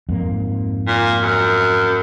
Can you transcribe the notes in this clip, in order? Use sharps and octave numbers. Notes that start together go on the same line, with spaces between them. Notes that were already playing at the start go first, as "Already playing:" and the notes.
F2 G#2 A#3
A#2
F#2